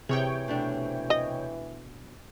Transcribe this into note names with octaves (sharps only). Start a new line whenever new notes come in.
C3 E3 G#4 C#5 G5
B2 A3 D4
D#5